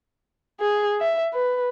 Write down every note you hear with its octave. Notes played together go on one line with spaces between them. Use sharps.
G#4
E5
B4